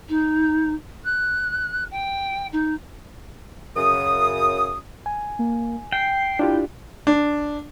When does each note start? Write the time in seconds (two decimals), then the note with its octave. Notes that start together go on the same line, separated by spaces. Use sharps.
0.08 D#4
1.04 F#6
1.91 G5
2.52 D#4
3.76 F#2 C#3 D#6
5.06 G#5
5.39 A#3
5.92 G5 C7
6.39 D4 E4 F4 G4
7.07 D4